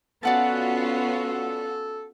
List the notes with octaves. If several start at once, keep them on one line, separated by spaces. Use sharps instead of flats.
B3 C#4 F4 F#4 A4 D5 F#5 A5